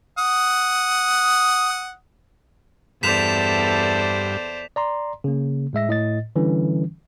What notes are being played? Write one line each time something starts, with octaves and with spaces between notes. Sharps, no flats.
F#5 D#6
E2 G2 A4 C5 D5 B6 E7 F7
D5 A#5 C6
C#3 A#3
A2 G#3 E5 A#6
A2 D#5 A6
D3 E3 G3 C#4